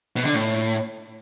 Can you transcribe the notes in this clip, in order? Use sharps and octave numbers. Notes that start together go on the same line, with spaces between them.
B2
D3
A2